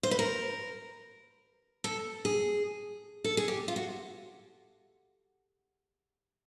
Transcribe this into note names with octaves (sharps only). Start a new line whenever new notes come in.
C5
B4
A#4
A4
G#4
A4
G#4
G4
F4
F#4